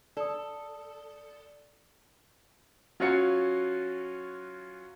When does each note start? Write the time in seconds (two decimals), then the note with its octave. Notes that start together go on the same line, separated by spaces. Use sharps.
0.17 A4 D5 D#6
3.00 F#3 C#4 F4 F#4 C#5 C#7